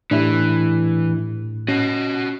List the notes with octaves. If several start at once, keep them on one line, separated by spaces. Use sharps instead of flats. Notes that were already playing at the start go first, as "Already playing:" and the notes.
A2 E3 D4 E4 G4
C#4 F#4 D#5